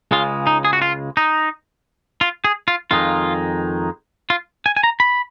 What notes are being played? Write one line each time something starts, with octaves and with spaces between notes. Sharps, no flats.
C#2 C#3 G#3 F4
D#4
G#4
F#4
F4
D#4
F4
G#4
F4
F2 D#3 G#3 D#4 F4
F4
G#5
G#5
A#5
B5